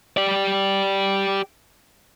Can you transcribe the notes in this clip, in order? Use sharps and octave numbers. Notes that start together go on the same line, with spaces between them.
G4 D5